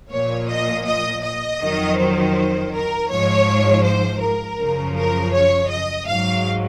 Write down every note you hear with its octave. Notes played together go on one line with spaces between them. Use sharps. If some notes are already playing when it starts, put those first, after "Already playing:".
A#2 F3 C#5
D#5
D#5
D#5
F2 D#3 F#3
C5
A#4
G#2 F3 C#5
C5
A#4
F#2 C#3 F3
A#4
C#5
D#5
G#2 F#3 F5